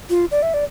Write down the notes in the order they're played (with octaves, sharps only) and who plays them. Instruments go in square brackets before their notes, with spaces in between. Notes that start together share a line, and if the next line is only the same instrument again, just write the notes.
[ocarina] F4
D5
E5
D5